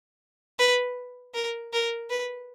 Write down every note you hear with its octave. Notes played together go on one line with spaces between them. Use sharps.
B4
A#4
A#4
B4